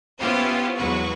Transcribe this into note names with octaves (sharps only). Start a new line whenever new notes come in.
B3 C#4 E4 F4 G4 C5
E2 F#3 G#3 F#4 B4 C#6